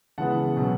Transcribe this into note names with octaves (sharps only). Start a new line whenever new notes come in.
C#3 E3 G#3 B3 F#5 A5
B2 F#3 C#4